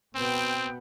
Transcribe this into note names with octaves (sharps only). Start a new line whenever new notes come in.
B2 B3 C4 G5